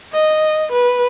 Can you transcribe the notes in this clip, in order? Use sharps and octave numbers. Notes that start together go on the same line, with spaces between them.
D#5
B4